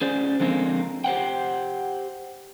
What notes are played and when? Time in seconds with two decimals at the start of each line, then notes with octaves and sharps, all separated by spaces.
0.02 C#4 G#4 C5 D5
0.40 D3 F3 G#3 A#3 C4
1.04 G4 C5 F#5 G5